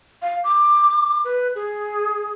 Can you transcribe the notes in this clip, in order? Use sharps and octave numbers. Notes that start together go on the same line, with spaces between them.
F5
D6
B4
G#4